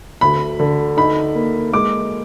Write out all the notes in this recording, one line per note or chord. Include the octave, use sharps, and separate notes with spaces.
D2 B5
D3
D#4 B5
A#3
G#3 D6